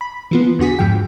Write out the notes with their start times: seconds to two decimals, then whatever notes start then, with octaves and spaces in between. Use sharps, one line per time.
0.01 B5
0.31 E3 F3 B3
0.59 E2 D3 F#4 G#4 B6
0.79 E2 G#2 F3 G5